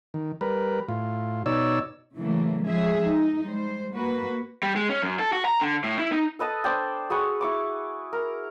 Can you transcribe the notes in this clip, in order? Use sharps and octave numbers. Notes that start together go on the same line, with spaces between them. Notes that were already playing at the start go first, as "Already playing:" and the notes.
D#3
G3 A#4 B4
A2 F4
B2 D#4 C#5 D5 E6
A2 C#3 E3 F#3 A3 A#3
F3 G#3 C#4 G#4 E5
D#4
G3 G#3 C5
A#3 F#4 B4
G3
G#3
C#4
F#2
A4
F#4
A#5
D3
A2
E4
D#4
A4 B4 D#5 A5
D4 C5 D5 G5
F#4 G#4 B4 C#6
E4 C#6 D6
A#4